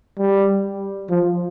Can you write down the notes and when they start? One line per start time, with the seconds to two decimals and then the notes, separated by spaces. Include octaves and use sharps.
0.19 G3
1.10 F3